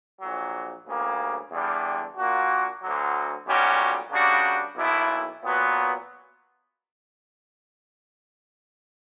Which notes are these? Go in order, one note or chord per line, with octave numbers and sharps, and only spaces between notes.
A#1 A#2 F#3
D2 C#3 G3 A#3
E2 D3 G3
A#2 A#3 D4 F#4
D2 D3 F#3
B1 A#2 G3 C#4 F#4
C#3 G3 A#3 D4 F#4
B1 B2 A#3 E4
A#2 F#3 B3 F#4